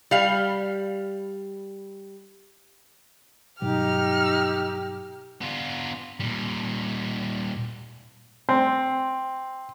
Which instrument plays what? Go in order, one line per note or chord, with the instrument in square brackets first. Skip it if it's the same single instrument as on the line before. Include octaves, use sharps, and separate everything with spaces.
[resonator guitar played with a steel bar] G3 F5
[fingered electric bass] G2 B2 F#3 [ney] D#4 [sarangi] G4 [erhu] F6
[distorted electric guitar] B3 F4
A#2 G3
[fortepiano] C4